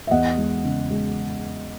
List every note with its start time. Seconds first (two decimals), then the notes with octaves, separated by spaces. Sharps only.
0.07 E5
0.11 E2 D#5 F#5
0.38 G#3
0.64 C#3
0.91 G#3